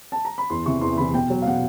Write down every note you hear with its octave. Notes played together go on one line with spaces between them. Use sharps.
A5
A#5
B5
E2 C6
C3 E3 C#6
E2 C6
C3 E3 B5
B2 G5
F#3
F5
B2 F#5